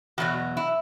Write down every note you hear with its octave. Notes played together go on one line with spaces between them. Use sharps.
E2 B2 F#3 F#4
E4